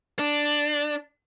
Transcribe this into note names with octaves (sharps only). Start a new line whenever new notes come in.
D4